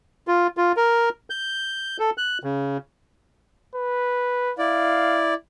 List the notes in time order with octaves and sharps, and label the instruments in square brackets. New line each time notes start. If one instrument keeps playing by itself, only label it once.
[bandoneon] F4
F4
A#4
G6
A4
F#6
C#3
[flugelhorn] B4
[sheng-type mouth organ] E4 D5 [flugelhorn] F5